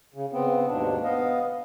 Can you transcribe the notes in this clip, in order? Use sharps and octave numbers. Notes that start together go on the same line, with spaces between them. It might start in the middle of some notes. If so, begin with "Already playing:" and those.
C#3
C#3 B3 C4
D#2 G#2 B2 D4
B3 D#5 F5